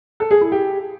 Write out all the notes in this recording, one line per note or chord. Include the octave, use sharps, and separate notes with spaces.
A4
G#4
E4
G4